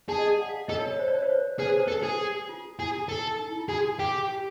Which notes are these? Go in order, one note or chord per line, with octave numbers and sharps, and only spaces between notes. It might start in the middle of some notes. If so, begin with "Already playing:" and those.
G#4 A5
D#5
D5
F#5
F5
A4 D#5
C#5
C#5
C5
D5
C#5
C5
B4
G#4 B4
C5
B4
A4
G#4
F4
E4 G#4
A4
D#4
E4
F4
F#4 G#4
G4
G4